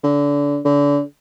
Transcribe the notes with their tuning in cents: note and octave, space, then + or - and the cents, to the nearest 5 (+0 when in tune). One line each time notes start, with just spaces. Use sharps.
D3 -30
D3 -35